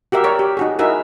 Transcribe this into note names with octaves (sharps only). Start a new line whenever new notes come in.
F#4 G4 A#4 E5
A#4 C#5 D5
G4
D#4 F#4 G#4
D#4 E4 F#4 G#4 A#4 E5